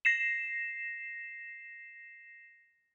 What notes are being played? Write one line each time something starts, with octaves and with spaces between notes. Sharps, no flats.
A#6 C7 E7